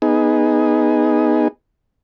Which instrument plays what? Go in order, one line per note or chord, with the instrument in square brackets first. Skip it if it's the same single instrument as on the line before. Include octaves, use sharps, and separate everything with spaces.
[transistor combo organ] B3 D#4 G#4